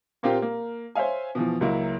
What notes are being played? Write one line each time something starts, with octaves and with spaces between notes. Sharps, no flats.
A#2 A#3 C4 F4 G4
A#3
C5 C#5 E5 F5 G#5
B2 E3 F3
C#2 F#3 A#3 E4